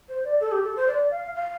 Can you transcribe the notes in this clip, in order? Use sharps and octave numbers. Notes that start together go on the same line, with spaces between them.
C5
D5
A4
G4
A4
C5
D5
F5
F5